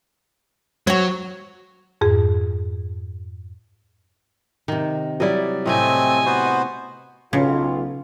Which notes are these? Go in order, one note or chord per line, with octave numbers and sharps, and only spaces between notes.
F#3 F#4 C#5
F2 G#2 G#4
C3 D#3
F#3 G3 E4 D5 D#5
A2 C3 A3 C4 G4 D#5 G#5
B3 F#4 C5
B1 C#3 F4